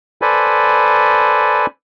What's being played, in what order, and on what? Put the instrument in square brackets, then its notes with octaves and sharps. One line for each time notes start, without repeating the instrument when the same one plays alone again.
[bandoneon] A4 B4 C5 D5 G#5 B5